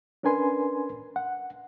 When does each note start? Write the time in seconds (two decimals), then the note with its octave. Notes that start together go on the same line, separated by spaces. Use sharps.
0.23 C#4 D4 A#4 B4 G#5 C6
1.16 F#5